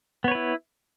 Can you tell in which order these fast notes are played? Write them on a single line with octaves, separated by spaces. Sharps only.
B3 C#5 B4 E4